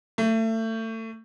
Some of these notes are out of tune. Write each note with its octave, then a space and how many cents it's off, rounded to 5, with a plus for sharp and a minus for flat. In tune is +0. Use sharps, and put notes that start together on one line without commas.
A3 +30